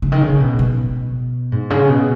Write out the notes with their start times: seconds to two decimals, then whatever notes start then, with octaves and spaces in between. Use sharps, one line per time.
0.02 C#3
0.12 D#3
0.21 C#3
0.40 B2
0.59 B2
1.52 G#2
1.70 C#3
1.89 B2